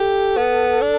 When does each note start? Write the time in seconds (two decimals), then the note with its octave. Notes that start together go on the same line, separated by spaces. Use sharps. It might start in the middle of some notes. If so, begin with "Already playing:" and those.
Already playing: G4 A4
0.37 B3
0.81 D4